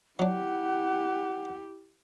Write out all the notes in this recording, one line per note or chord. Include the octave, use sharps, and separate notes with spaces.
F#3 D4 E4 G4 F#5